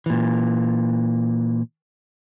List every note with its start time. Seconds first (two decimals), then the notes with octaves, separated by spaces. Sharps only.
0.06 A#2 E3